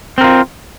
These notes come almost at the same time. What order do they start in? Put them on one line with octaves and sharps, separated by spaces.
C4 A#4 F4